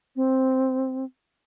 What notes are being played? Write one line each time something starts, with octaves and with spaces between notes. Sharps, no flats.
C4